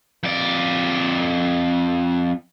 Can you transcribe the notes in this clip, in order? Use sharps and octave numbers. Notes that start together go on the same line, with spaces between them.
F2 D5